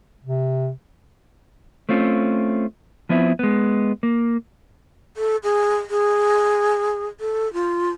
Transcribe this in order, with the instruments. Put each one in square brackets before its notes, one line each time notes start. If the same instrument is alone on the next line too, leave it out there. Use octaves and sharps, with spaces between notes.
[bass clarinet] C3
[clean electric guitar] A3 C4 C#4 F4
F3 B3 C4 E4
G#3 B3
A#3
[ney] A4
G#4
G#4
A4
F4